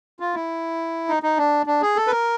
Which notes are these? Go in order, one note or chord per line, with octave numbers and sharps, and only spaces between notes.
F4
E4
D#4
D#4
D4
D4
G#4
A4
B4
A#4